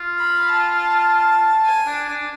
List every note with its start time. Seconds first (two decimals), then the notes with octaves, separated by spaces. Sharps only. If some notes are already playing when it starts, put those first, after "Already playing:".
Already playing: F4
0.19 B5
0.48 A5
0.78 A5
1.65 G#5
1.86 D4
2.08 D4